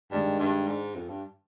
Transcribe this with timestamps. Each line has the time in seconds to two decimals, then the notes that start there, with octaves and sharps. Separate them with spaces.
0.11 G2 D#3 G#3 D4
0.39 G2
0.68 G#2
0.95 F2
1.09 G2